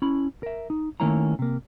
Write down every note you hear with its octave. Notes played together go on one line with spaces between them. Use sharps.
C#4 E4 B5
A#4 E5
D#4
D#3 A3 A#3 C#4 E4 A#5
C3 A#3